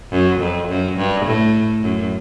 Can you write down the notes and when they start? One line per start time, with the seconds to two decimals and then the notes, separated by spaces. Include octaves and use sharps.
0.12 F#2
0.40 F2
0.69 F#2
0.97 G2
1.25 A2
1.82 F#2